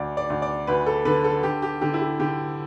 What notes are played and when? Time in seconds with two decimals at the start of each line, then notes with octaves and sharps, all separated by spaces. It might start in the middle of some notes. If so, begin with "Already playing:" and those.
Already playing: D2 D5
0.17 D5
0.30 D2
0.42 D5
0.67 D2 B4
0.86 A4
1.05 D3 B4
1.24 A4
1.43 D3 G4
1.62 G4
1.81 D3 G4
1.94 E4
2.01 G4
2.20 D3 G4